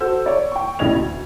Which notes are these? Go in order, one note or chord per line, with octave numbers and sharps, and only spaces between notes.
F#4 A4 C5 E6
C#5 D5
G5 C#6
A1 A2 D4 D#5 G#6 F7
D2